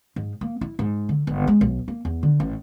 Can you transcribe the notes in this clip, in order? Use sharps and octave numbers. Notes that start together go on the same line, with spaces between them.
G#2
A#3
E4
G#2
D3
G1
G#3
B1
A#3
E2
D3
A1